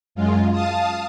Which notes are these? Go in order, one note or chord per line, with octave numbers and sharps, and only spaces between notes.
F#2 G#3 F4
F5 A5 D#6